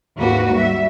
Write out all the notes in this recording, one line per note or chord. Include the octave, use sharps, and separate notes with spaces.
D#2 G#2 A#3 F#4 B4
G3 E5